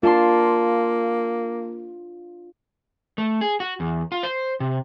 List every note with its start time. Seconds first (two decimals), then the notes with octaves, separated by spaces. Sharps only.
0.03 A#3 D4 F4 A5 C6
3.18 A3
3.41 G#4
3.60 F#4
3.80 E2
4.12 F4
4.23 C5
4.60 C3